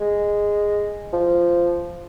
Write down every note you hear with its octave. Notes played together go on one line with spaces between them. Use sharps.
G#3
F3